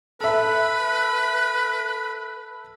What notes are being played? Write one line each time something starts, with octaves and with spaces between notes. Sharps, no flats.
A4 B4 E5 B5